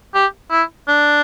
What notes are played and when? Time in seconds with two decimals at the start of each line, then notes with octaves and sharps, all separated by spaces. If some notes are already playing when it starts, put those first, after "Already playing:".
0.14 G4
0.51 E4
0.88 D4